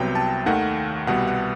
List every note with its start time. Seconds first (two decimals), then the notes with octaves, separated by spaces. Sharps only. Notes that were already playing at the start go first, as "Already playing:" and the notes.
Already playing: C2 C3 F#3 B3 G5
0.15 A5
0.46 D#2 D#3 A3 F#5
1.07 C2 B2 G3 B3 F#5
1.27 F#5